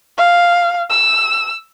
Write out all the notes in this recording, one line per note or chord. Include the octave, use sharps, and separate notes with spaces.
F5
E6